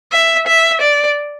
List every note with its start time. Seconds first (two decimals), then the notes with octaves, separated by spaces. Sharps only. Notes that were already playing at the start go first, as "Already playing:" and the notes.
0.12 E5
0.47 E5
0.81 D5